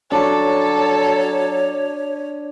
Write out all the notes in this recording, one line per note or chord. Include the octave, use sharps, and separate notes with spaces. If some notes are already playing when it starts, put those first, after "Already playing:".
F#3 D4 A4 C#5 C#6